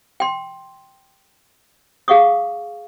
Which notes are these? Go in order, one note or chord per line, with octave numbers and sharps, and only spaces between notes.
G5 C6
G#4 F5 F#5 C#6 D#6